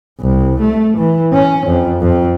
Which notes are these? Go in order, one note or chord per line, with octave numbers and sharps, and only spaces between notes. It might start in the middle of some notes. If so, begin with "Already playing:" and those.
C2
A3
E3
C#4
F2
F2